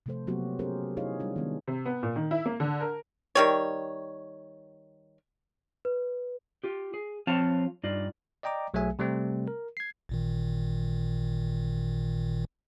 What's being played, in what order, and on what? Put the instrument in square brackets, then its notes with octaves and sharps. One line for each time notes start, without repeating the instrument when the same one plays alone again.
[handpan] C3 F3 A3 A4 C5
F#3 A#3 B3 F#4 G4
C#4 G4 G#4 A#4 C5
D#4 E4 G#4 C#5 D#5 F5
G3 D4 F4
D#3 F#3 G#3 B3
[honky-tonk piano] C3
B3
A#2
D#3
E4
A#3
D3
A#4
[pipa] D#3 G3 C#5
[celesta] B4
[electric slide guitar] F4 G4
G#4
F3 C4 F4 C#5 F5 A5
G2 D#4 F4 D5
[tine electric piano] D5 D#5 G5 A#5 D6
B1 F#3 A3 G#4 E5 G#5
C3 G3 A3 C4
A#4
G#6 C7
[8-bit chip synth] A1 A#2 D#3